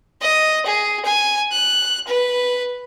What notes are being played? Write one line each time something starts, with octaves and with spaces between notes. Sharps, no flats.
D#5
G#4
G#5
F#6
B4